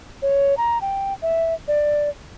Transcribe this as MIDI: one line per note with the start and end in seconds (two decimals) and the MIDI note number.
0.22 0.55 73
0.57 0.78 82
0.81 1.14 79
1.22 1.54 76
1.68 2.09 74